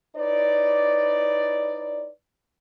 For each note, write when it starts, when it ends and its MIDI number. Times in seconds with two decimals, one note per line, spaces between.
0.16 2.09 63
0.16 2.09 64
0.16 2.09 71
0.16 2.09 73
0.16 2.09 74